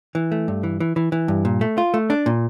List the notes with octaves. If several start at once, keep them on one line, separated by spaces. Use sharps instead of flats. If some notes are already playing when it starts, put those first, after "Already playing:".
E3
A3
G2
E3
E3
E3
E3
G2
A#2
A3
F4
A3
D4
A#2